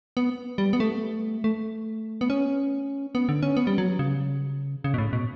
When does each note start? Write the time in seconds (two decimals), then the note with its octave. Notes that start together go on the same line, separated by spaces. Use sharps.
0.17 B3
0.58 G3
0.73 B3
0.80 A3
1.44 A3
2.21 B3
2.30 C#4
3.15 B3
3.29 D3
3.43 C#4
3.57 B3
3.67 G3
3.78 F#3
3.99 C#3
4.84 C#3
4.94 B2
4.98 A2
5.13 B2